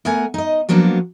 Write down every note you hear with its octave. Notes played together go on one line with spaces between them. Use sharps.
A3 B3 A#4 F#5 G#5
D#4 D#5
F3 F#3 A#3 B3 D4 F#4